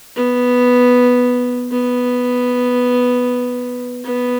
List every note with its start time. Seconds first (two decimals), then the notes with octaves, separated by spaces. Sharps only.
0.16 B3
1.71 B3
4.05 B3